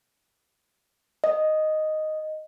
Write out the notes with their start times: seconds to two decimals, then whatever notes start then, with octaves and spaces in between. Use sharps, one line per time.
1.24 D#5